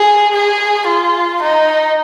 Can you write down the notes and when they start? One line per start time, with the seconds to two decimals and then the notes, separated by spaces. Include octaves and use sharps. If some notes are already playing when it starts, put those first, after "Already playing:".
Already playing: G#4
0.34 G#4
0.87 F4
1.42 D#4